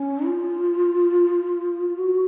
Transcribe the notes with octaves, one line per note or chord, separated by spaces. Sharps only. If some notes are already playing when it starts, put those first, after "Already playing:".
Already playing: C#4
F4
F#4